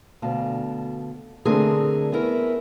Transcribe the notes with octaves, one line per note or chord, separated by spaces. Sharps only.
D2 B2 F5 A5
D3 A3 C4 D4 G#4 A#4
B3 C#4 E4 A#4